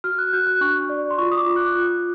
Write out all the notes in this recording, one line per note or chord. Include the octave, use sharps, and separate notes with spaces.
F#4 F6
F#6
F#4 G6
F#6
D4 C#6
D5
C6
F4 C#6
D#6
D6
F4
F#6
F4